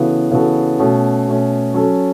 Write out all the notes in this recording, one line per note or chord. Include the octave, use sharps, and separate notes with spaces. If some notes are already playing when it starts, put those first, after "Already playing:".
Already playing: C#3 E3 B3 F#4 A4
C#3 E3 B3 F#4 A4
B2 A3 C#4
B2 A3 C#4
F#3 C#4 F#4 A4